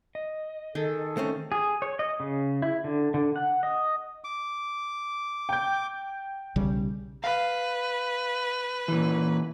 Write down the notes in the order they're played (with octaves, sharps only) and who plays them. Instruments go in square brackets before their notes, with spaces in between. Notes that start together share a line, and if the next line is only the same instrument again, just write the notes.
[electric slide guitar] D#5
[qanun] D#3 G#4 G5 [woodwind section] A4
[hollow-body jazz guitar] A3 C4 C#4
[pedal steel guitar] G#4
C#5
D#5
C#3
E4
D3
D3
F#5
D#5
[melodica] D6
[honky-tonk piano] G5 G6
[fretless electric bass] B1 C#3 G3
[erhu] B4 [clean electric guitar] F5
[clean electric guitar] A#2 E3